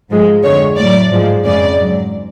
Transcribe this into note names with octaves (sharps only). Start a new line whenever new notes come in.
G#2 F3 G#3
F2 D3 G#3 C#5
A2 F#3 D5
G#2 F3 G#3
F2 C#3 G#3 D5
G#2 F#3